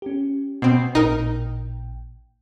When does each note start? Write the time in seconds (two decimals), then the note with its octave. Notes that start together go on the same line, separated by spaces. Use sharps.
0.02 C#4 G4
0.62 B2 C4 C7
0.95 A1 A#2 D#4 A#4 G5